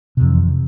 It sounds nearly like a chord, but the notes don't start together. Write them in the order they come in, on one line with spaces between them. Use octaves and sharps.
C3 F2 E3